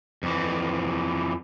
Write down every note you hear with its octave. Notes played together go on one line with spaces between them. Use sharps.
F2 E3